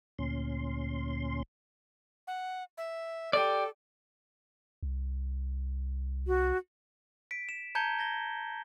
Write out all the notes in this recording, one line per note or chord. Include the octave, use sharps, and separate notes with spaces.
D2 A#2 C#4 C6
F#5
E5
G4 A4 D5
C2
F#4
B6 D7
E7
A5 A#5 G6 G#6 C#7 G7
G#6 A#6 G7